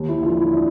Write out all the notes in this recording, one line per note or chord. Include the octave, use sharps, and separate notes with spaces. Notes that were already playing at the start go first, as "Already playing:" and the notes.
Already playing: D#2
E4
D3 F3 F4
E4
D4